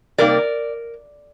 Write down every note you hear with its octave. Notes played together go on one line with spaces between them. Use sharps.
C3 G3 A#3 D#4 A#4 D5